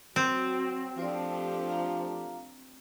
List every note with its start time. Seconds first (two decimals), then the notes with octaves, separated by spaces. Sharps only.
0.16 F#3 C4
0.98 F3 A3 D4 F4 G4 C5 D5
1.68 F4 F5 A#5